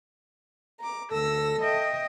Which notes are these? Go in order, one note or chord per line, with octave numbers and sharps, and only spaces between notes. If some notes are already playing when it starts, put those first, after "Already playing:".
A#5 D6
D2 A4 E6 A#6
D#5 E5 G5